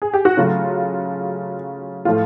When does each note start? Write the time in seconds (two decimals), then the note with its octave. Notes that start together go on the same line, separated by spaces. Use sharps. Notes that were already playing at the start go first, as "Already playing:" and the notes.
0.02 G#4
0.13 G4
0.25 F#4
0.37 C#3 F#3 A3 F4
2.05 A2 F3 A3 F4